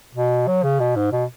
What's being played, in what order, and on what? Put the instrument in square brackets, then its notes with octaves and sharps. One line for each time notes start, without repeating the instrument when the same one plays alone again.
[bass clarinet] B2
F#3
C#3
B2
G#2
B2